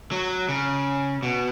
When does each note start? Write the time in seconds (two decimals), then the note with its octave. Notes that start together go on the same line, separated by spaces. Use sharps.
0.12 F#3
0.49 C#3
1.23 B2